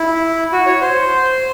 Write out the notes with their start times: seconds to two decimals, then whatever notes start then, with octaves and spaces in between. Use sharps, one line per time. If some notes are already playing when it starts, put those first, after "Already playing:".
Already playing: E4
0.53 F#4
0.66 C#5
0.81 C5